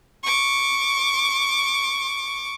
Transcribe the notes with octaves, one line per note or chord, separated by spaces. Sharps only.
C#6 D6